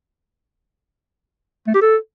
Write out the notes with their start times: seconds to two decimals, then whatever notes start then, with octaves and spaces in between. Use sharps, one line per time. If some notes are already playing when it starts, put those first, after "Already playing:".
1.67 A3
1.74 G4
1.81 A4